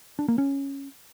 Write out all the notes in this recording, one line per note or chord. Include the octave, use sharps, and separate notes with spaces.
D4
A#3
C#4